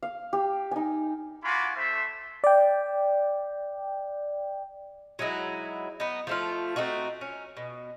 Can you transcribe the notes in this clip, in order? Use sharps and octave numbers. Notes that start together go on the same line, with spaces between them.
F5
G4
D#4 G#5
F4 F#4 G#5 B5 C6 D6
A3 C5 E5
D5 G5
F#3 G#3 D#4 E4
B3 D#4
F3 A3 F4
A3 C4 D#4 F#4
C#4
B2